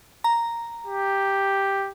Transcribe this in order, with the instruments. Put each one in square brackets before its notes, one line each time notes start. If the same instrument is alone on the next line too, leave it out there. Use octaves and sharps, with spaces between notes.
[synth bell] A#5
[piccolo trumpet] G4